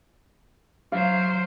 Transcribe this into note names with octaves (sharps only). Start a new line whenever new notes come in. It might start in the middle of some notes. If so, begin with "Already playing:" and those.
F#3 C5 F5